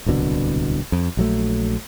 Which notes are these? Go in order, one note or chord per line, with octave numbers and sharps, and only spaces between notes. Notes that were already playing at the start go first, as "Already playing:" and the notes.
D1 C2 B2 D3
F2
A#1 F#3 A3